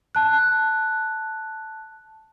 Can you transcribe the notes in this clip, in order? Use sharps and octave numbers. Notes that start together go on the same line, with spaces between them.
A5 F#6